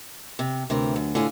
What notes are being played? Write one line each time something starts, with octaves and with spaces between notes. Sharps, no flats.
C3
D2 C3 E3 A#4
F#2
A2 D3 F4 G#5